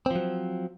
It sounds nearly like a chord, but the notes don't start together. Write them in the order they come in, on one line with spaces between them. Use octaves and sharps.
C4 F3 F#3